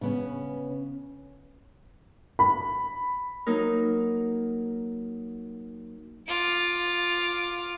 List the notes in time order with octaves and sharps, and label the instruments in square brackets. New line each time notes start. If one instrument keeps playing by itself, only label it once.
[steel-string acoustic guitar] C#3 B3 C#4
[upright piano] B5
[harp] F#3 A#3 D#4 A#4
[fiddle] F4 D6